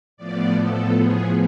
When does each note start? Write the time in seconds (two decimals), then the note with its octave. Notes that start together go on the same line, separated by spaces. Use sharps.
0.17 A2 F3 B3 D5
0.57 A4
0.96 G#4